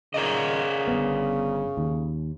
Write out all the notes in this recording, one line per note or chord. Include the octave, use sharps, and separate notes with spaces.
C#3 A#4 D5 D#5
G1 B3
D#2